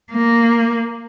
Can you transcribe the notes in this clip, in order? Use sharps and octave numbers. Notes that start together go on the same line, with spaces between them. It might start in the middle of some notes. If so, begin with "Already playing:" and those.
A#3